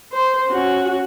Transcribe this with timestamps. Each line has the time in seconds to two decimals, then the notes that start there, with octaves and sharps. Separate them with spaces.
0.12 C5
0.47 C#4 F#4